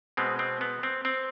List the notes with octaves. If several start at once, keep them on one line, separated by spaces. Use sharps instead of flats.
B2 G#3 B3 C4
C4
B3
C4
C4